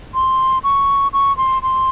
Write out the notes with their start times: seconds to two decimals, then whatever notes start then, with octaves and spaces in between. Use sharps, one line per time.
0.14 C6
0.64 C#6
1.13 C#6
1.37 C6
1.62 C6